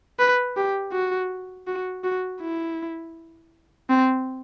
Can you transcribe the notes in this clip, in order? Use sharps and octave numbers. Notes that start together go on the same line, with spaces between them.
B4
G4
F#4
F#4
F#4
E4
C4